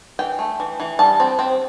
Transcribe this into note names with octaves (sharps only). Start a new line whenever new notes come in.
E3 G5
A3
E3
E3
G3 A5
C4
C4